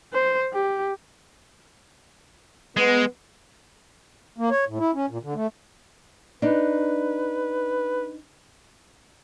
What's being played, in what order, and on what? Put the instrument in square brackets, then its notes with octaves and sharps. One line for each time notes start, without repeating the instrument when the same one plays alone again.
[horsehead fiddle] C5
G4
[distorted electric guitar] G#3 [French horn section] B3
[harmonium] A#3
C#5
A2
E4
C#4
A#2
D3
A3
[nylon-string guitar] D4 D#4 [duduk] B4